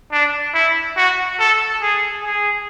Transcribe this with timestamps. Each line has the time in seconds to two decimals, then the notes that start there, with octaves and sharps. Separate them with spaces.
0.12 D4
0.54 E4
0.97 F#4
1.39 A4
1.82 G#4
2.24 G#4